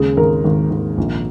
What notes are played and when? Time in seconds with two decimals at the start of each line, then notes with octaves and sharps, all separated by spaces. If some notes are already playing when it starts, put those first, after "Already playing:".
Already playing: D#2 C#3 G#3 G#4
0.17 G#1 A#4
0.44 G#1
0.70 G#1
0.98 A#1